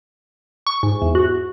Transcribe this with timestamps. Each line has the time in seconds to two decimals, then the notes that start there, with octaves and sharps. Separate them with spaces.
0.67 C#6
0.83 G#2
1.02 E2
1.15 F#4